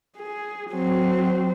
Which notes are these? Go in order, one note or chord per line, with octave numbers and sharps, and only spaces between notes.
G#4
F#3 C4